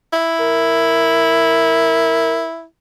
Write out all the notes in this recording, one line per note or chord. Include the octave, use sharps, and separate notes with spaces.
E4
A#4